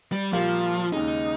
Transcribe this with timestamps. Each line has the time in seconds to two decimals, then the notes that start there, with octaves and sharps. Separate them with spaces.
0.12 G3
0.33 A#2 F3 G3 A#3 F4
0.93 D#2 C#3 G#3 D#4